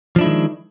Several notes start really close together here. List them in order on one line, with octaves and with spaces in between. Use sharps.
F3 D4 E4 G#3 D#3